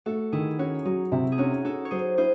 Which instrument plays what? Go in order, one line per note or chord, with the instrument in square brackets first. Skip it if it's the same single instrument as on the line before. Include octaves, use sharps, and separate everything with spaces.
[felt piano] A3 [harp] F#4 A4
[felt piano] D#3 [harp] E4 G#4
[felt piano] C#4 [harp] D#4 F#4
[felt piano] F#3 [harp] D#4
[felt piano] C3 [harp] E4
[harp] G#4
[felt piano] C#4 [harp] D#4 F#4
[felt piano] C#4 [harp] F#4 A4
[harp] C#5
[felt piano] F#3 [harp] G#4 C5
[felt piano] E4 [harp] G#4 C5